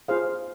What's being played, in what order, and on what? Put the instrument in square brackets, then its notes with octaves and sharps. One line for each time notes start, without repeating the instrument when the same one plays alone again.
[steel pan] F4 G#4 C5 F5